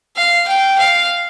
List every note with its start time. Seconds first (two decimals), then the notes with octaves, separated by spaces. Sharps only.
0.16 F5
0.47 G5
0.79 F5